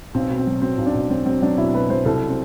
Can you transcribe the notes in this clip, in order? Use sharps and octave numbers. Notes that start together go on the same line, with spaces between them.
B1 C4
B2
C4
F#3
F#3 C4
B1
D4
B1
F#3 C4
F#3 C4
F#3 D4
B2 E4
B2 B4
F#3 C5
C2 A4
C4